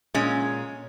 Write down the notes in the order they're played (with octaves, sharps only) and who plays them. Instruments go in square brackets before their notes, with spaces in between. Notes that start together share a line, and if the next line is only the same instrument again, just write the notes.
[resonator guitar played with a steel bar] A#2 G#3 C#4